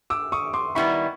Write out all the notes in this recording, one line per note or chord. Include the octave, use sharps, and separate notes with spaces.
D6 E6
C#6 D#6
C6 D6
D#3 G3 B3 E4 B5 C#6